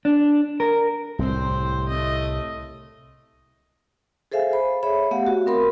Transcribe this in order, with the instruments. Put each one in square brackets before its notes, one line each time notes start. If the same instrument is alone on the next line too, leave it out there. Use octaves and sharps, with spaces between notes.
[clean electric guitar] D4
A#4
[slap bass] C2 A2 [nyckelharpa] C4 C5
[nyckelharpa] A3 D#5
[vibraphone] G#4 A4 C5 E5 F5 G#5
C5 B5
G#4 C#5 E5 B5
A3 B3 G4 F5 F#5
F#4
C4 A#4 B5 C6